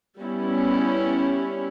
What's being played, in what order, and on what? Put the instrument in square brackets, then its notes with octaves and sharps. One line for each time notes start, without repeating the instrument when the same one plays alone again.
[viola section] G3 B3 C#4 E4